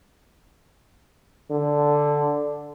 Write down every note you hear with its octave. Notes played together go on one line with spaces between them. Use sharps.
D3